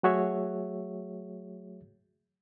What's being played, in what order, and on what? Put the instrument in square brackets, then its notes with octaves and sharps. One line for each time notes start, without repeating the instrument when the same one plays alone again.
[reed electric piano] F#3 A3 F#4 G#4 C#5 E5